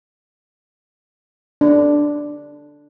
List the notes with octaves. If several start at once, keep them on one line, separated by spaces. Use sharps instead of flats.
D4